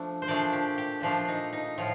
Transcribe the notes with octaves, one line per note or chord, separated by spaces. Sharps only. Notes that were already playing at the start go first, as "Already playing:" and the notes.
Already playing: F3 A3 D4
C5
A#2 F3 A3 D4 D5
G4
G4
A#2 F3 A3 D4 F4
D#4
D#4
A2 F3 F4